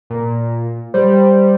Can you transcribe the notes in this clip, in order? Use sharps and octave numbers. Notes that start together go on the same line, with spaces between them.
A#2
G3 C5